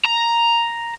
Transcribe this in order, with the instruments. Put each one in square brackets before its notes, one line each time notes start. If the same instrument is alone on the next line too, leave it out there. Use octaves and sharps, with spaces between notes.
[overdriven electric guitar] A#5